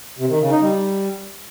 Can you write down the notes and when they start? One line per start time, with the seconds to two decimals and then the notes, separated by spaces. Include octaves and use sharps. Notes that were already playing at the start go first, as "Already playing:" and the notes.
0.19 C3
0.29 D#3
0.40 C#3
0.51 D#4
0.62 G3